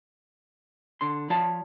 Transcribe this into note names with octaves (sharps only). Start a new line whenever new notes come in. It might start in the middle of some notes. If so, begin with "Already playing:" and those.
D3 C6
F3 F4 C#5 D5 A5